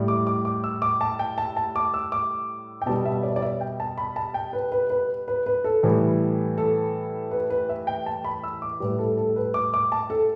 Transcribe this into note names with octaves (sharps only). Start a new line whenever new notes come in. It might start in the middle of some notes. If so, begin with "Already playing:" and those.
Already playing: A2 G3
D6
D6
D6
E6
D6
A5
G5
A5
A5
D6
E6
D6
G5
B2 G3 A5
E5
D5
D5
E5
G5
A5
B5
A5
G5
B4
B4
B4
B4
B4
A4
A2 E3 G3
A4
B4
B4
E5
G5
A5
B5
E6
D6
A2 G3 B4
A4
A4
B4
D6
D6
A5
A4